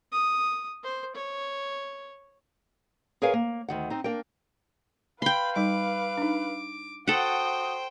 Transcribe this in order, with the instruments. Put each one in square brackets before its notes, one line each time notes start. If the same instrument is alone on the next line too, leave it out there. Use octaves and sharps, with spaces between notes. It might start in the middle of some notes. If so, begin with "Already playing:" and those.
[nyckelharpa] D#6
C5
C#5
[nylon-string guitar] G#4 A#4 B4 C#5 F5 G#5
A#3
D2 D#3 F#5
C4 D#4
A#3 D4 A#4 G5
[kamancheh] B4 F5 [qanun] G5 C6 [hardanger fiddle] B5
[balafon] G3 D#4 [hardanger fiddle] D6
[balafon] D4 D#4
[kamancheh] F#4 D#6 [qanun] A4 F#5 [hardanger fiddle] C5 G5